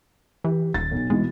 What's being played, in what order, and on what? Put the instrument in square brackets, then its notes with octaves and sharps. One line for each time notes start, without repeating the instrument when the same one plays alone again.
[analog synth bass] E3 [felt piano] G4
[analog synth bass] D#1 [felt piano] A6
[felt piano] B1
[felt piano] B2 E3 [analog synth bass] G#3